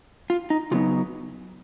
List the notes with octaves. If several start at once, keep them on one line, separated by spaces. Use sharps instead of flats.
F4
D#4
C#3 F#3 B3 D#4 F4